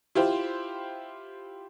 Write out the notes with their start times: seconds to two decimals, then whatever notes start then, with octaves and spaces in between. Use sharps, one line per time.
0.15 E4 F4 G4 C5